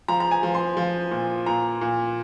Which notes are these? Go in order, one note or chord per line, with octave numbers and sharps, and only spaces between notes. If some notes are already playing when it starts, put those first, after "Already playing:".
F3 A#5
A#5
G#5
F3
C6
F3
A#2
A#2 A#5
A#2